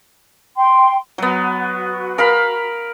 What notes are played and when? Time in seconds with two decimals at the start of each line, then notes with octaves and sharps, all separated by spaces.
0.56 G5 C6
1.18 F#3 B3 F#4
2.18 A#4 F5 B5